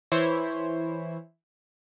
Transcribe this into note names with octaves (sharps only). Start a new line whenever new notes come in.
E3 E4 C5 C#5